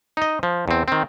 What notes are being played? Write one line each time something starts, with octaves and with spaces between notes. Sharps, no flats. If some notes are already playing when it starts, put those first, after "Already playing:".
D#4 D#5
F3
E2 C4
D#3 C4